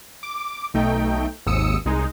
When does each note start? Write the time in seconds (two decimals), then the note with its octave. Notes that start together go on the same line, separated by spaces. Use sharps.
0.23 D6
0.74 B1 A3 D#4 G5
1.46 G#1 D#2 G#2 D#6 E6 C#7
1.85 C2 G#3 D#4